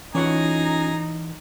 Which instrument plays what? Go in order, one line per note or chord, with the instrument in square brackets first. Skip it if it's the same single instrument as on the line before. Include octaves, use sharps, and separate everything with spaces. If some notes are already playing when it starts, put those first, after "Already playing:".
[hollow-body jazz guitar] E3 C#5 F#5 [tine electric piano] C#4 F4 [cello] D#4 [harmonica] G#4 A#5